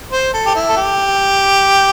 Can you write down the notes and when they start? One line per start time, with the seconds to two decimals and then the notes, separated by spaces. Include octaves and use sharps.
0.12 C5
0.34 A4
0.46 G4
0.55 E4
0.69 A4
0.76 G4